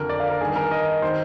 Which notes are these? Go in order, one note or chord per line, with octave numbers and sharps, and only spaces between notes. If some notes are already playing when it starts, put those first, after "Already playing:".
Already playing: F2 D3 A#4
D5
F5
A#4
G2 D#3 G#4
A#4
D#5
D#3 C5